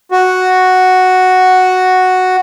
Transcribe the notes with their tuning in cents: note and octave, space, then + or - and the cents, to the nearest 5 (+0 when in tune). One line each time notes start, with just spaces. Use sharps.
F#4 +0